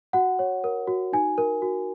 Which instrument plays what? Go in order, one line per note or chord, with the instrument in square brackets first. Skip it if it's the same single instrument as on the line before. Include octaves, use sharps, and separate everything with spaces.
[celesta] F#4 F#5
C#5
A#4
F#4
D#4 G#5
A#4
F#4